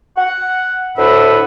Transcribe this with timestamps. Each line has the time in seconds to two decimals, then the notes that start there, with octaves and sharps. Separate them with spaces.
0.18 F#5
0.97 D2 A2 D4 B4 E5 F#5